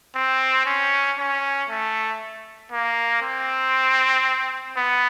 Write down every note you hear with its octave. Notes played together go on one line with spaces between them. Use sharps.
C4
C#4
C#4
A3
A#3
C4
B3